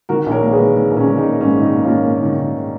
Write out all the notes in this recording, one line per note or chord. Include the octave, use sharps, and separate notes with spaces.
D#3 F#4 A#4
A#1
A#4 C#5
A#3
G#4 B4
D#3
D#3
A#1
C#4
D#3
D#4
A#3
G#2 C#4
D#3 D#4
A#3
A#3 C#4 F4
A#3
D#3
D#3